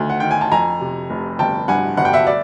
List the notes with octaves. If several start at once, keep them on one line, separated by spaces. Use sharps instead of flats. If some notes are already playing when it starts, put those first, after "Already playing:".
Already playing: D2 D#3
F#5
D#3 G5
G#5
A5
F2 G#5 A#5
C3
F1
G1 G5 A5
G2 F#5 G#5
G1 F#5
G5
E5 F#5
D5 E5